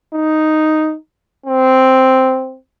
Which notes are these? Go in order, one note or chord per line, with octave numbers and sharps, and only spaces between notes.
D#4
C4